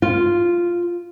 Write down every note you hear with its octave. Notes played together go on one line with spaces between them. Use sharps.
F4